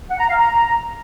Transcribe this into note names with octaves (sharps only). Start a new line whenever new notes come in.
F#5
A#5
F5
A#5